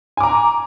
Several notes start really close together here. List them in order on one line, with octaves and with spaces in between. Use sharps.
G#5 D6 A#5